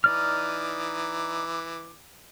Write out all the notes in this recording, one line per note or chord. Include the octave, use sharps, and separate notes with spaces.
E3 D#4 D5 D6 F6